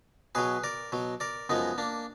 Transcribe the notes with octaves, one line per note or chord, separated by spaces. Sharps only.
B2 F#3 G#4 B4
A#4 D5
B2 F#3
A#4 D5
F#2 F3 G#3 B3 D#4
A#3 D4